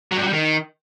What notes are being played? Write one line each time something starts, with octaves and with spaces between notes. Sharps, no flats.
F#3
G2
F#3
G3
D#3